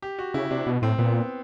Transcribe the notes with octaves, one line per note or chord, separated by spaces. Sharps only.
G4
F#4
C#3 E4
C3 D4
B2
A2 C4
A#2 B3